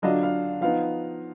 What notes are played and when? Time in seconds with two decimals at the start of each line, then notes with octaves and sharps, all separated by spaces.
0.02 D3 F#3 D4 F4 D#5
0.23 F5
0.61 F3 B3 D#4 F5